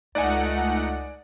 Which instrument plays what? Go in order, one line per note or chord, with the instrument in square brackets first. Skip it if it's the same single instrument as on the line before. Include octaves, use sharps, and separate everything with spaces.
[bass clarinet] C#2 [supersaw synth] A3 D#4 F#5 [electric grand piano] D5 G#5